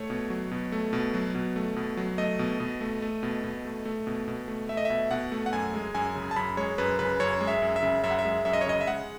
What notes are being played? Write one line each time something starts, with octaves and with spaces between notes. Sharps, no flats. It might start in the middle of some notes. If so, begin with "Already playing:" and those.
Already playing: A3 C#5
B2
F#3
B2
A3
B2
F#3
B2
A3
B2
F#3
A3 D#5
B2
B2
A3
A3
B2
B2
A3
A3
B2
B2
A3
A3 E5
D#5
B2 E5
B2 F#5
A3
F#5
F#2 G#5
G#3
F#2 G#5
C#3
A5
F#2 B5
G#3 C#5
F#2 B4
C#3 B4
F#2 C#5
G#3
E5
F#2
E5
C#3
F#2 E5
F#5
E5
G#3
F#2 E5
D#5
C#5
C#3 D#5
E5
G#3 F#5